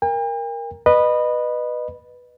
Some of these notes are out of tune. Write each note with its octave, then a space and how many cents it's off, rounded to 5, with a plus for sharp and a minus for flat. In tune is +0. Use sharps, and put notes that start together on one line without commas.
A#4 +5 G5 +45
B4 -5 D#5 -25